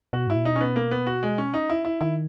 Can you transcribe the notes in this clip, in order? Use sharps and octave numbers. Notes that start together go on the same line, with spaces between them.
B2 F#4
G#2 E4
A#2
B2 D#4
C#4
B3
A#3
B3
F#4
G#3
C#4
D#4
E4
E4
D#3 E4